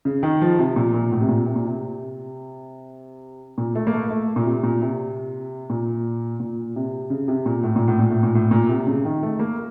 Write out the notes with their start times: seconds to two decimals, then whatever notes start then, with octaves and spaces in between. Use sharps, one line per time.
0.05 C#3
0.23 D#3
0.41 F3
0.59 C3
0.76 A#2
0.94 A#2
1.12 A2
1.21 C3
1.29 A#2
1.46 C3
1.56 A#2
1.66 C3
3.58 A#2
3.75 A3
3.87 A#3
3.93 A3
4.10 A3
4.36 A#2
4.46 C3
4.63 A#2
4.82 C3
5.70 A#2
6.40 A#2
6.76 C3
7.10 C#3
7.28 C3
7.46 A#2
7.63 A2
7.76 A#2
7.88 A2
7.99 A#2
8.10 A2
8.23 A#2
8.35 A2
8.51 A#2
8.69 C3
8.87 C#3
9.05 D#3
9.23 A3
9.39 A#3